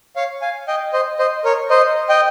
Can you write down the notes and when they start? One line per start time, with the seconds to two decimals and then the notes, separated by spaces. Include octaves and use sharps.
0.16 C#5 F5
0.42 F5 G#5
0.68 D#5 G5
0.93 C5 D#5
1.19 C5 D#5
1.44 A#4 C#5
1.70 C5 D#5
2.09 D#5 G5